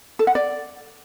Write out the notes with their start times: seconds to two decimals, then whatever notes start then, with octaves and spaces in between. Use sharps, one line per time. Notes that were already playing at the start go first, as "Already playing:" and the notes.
0.19 A4
0.27 F#5
0.35 D5